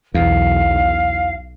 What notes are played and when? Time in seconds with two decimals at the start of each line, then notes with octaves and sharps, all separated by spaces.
0.14 B1 E2 F5